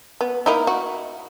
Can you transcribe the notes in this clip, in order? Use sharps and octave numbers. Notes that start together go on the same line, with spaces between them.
B3
A#3 D#4 E4
F#4